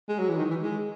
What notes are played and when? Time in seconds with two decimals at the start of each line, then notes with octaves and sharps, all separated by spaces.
0.09 G#3
0.19 F#3
0.29 E3
0.38 D#3
0.50 E3
0.62 G#3